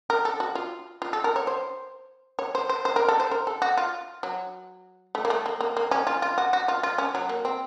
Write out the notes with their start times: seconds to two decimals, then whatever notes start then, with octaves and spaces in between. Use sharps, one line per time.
0.10 A#4
0.25 A4
0.40 F#4
0.55 F4
1.02 F4
1.13 A4
1.24 A#4
1.36 C#5
1.47 C5
2.39 C#5
2.55 C5
2.69 C5
2.85 C5
2.96 A#4
3.08 A4
3.20 C5
3.31 A#4
3.47 A4
3.62 F#4
3.77 F4
4.23 F#3
5.15 A3
5.25 A#3
5.30 A3
5.46 A#3
5.61 A#3
5.77 A#3
5.91 C#4
6.07 F4
6.22 F4
6.38 F#4
6.53 F#4
6.68 F4
6.83 F4
6.98 C#4
7.15 F#3
7.29 A#3
7.45 C4